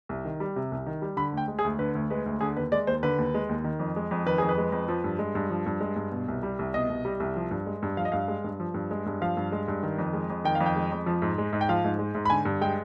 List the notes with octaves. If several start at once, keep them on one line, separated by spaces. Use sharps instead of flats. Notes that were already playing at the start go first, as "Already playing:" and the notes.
C2
D#3
G3
C3
C2
D#3
G3
D3 B5
D2
G5
G#3
G#4
D2
D3 B4
D2
G#3 B4
D2
D3 G#4
D#2 B4
G#3 D5
D#2 C5
D3 B4
D#2
G#3
D#2
D#3
F2
G#3
F2
D#3 B4
F2 G#4
B4
G#3
F2
F3
G2
G#3
G2
F3
G2
G#3
G2
B2
C2
G3
C2
B2 D#5
C2
G3
C2
F3
G2
G#3
G2
F3 F5
D#5
G2 F5
G#3
G2
F3
G2
G#3
G2
F3 F5
G2
G#3
G2
D#3
F2
G#3
F2
D#3 G5
F5
F2
G5
G#3
F2
F3
G#2
G#3
G#2
G5
F3 F5
G#2
G#3
G#2
B5
D3 G#5
G2
G#3 G5